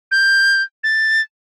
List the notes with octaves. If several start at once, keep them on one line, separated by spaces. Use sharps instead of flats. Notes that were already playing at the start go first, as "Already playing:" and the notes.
G6
A6